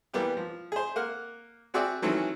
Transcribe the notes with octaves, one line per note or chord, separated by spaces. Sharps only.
E3 G3 A#3 B3 G4
F3
G#4 C5
A#3 F#5 F6
C4 F#4 G#4 D5 E5 G5
D#3 E3 F#3 A3 C4 C#4